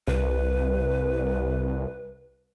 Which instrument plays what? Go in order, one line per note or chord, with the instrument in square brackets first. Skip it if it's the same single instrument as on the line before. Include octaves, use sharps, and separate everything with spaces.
[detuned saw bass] C2 [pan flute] B4